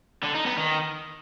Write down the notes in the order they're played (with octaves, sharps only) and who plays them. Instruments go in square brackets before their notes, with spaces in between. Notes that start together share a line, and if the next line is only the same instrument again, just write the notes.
[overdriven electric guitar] D3
D#4
B3
D#3